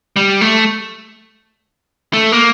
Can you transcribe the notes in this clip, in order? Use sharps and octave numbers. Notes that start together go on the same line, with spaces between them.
G3
A3
A3
A#3